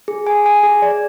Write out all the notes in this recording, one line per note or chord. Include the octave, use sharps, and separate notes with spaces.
G#4
G#5
G#5
G#4
D5